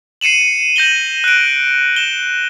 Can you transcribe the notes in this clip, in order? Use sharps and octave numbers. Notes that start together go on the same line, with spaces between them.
C7 C#7 D#7 E7 F#7
G6 A#6 F#7 G7
F#6 D7
E7 G7